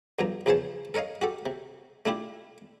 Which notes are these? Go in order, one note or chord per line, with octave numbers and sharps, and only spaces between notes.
B1 G2 F3 A#5
A#1 E2 C#3 C5 C#5 A5
A4 A#4 C#5 D#5 F5
F#4 G4 A4
C3
A3 D4 E4 F4 G4